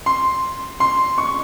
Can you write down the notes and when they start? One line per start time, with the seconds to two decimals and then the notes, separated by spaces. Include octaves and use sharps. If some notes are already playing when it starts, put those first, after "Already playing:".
0.06 C6
0.80 C6
1.18 C#6